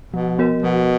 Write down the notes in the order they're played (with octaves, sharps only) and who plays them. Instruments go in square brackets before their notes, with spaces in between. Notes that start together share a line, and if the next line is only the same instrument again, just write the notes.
[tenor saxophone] B2 [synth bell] F3
[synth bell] B3 F#4 A#4 D#5
[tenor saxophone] B2 [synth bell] F3